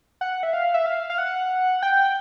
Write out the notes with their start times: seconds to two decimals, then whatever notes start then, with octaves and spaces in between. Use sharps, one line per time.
0.21 F#5
0.43 E5
0.53 F5
0.74 E5
0.86 F5
1.10 F5
1.18 F#5
1.83 G5